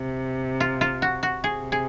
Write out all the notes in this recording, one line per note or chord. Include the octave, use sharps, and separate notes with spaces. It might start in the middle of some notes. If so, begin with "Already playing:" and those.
Already playing: C3
F4
F4
F#4
F#4
C3 G#4
G#4